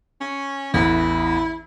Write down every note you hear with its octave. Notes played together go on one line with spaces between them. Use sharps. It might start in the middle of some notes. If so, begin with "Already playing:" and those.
C#4
A1 E2 E4